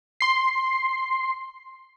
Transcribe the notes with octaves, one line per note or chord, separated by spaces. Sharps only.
C6 C7